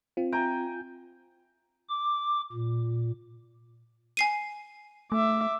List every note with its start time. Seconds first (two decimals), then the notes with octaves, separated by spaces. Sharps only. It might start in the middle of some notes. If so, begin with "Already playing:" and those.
0.17 C4 F4
0.32 G5 G#5 A#5
1.89 D6
2.52 A#2
4.17 G#5 C7 D#7
5.12 A3 E5 D6